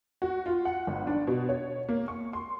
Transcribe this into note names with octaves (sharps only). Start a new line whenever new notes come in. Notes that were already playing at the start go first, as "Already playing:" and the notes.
F#4
F4
F#5
G1
D4
B2
C#5
A#3
C#6
C6